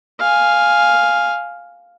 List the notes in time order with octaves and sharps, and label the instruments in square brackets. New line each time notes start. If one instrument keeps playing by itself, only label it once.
[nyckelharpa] F5 G#5